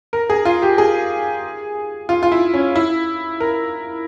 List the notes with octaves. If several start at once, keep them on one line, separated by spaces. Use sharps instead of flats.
A#4
G#4
F4
G4
G#4
F4
F4
E4
C#4
E4
A#4